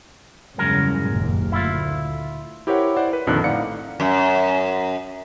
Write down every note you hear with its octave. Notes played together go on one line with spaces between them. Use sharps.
E2 G2 C#3 F#3 G#3 A#4
F#1 D#2 A#2
D2 E4 F4
E4 G4 A#4 C5 C#5 F#5
E4 C5 D5 F#5
B4
A#1 F2 D3 D#3 F#6
A2 D#4 D5 F5 F#5 C#7
F#2